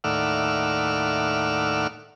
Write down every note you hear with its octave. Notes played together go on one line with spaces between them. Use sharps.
D#2 A2 D5 E5 F#5 F6